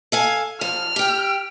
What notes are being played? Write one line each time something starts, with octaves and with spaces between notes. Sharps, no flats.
A4 F5 G#5
F3 F6
G4 G5